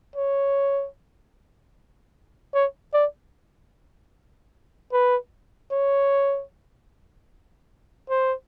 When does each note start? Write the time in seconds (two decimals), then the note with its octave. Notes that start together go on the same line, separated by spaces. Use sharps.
0.16 C#5
2.54 C#5
2.93 D5
4.92 B4
5.71 C#5
8.10 C5